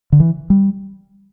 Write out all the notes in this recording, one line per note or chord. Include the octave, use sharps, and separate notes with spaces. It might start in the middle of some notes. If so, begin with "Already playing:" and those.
D3
E3
G3